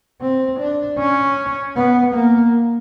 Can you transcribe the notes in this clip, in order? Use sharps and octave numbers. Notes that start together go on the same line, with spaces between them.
C4
D4
C#4
B3
A#3